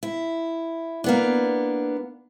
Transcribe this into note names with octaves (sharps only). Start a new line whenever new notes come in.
E4
A#3 B3 D4